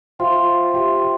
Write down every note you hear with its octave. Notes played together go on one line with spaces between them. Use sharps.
F4 C5 E5 G5 C6
G4 C5 E5 G5 C6